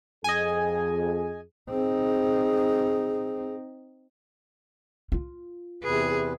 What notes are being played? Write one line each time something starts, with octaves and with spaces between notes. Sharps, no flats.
F2 G#4 D#5 G#5
C4 D#4 G#4
F4
E2 C3 G#4 B4